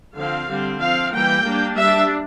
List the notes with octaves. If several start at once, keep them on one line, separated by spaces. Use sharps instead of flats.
D3 F3 C4 F5
D3 G3 C4
F3 C4 F5
E3 G3 A#3 G5
G3 A#3 D4
G3 D4 E5